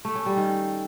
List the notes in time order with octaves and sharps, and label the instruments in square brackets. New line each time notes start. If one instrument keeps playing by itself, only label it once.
[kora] A3
C#4
G3
D#3